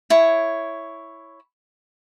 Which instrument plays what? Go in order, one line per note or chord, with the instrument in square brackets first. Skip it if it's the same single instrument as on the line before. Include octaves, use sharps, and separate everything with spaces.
[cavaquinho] E4 C#5